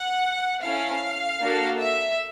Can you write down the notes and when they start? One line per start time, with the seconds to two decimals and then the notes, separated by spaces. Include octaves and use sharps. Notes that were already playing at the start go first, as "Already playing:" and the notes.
Already playing: F#5
0.63 C#4 E4 A4 F5
1.41 A#3 D4 F#4 A4
1.80 E5